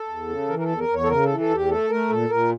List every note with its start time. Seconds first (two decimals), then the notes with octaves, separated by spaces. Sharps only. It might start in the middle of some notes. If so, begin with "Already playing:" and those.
Already playing: A4
0.08 E2
0.29 C#3
0.48 E3 A#4
0.59 A#4
0.63 A4
0.69 E2
0.79 A#4
0.88 E2
0.94 C#5
1.03 A4
1.08 C#3 A#4
1.24 E3 A4
1.40 A4
1.49 E2 G4
1.69 A3 A4
1.90 A3 A#4
2.10 A#2 A4
2.29 A#2 A#4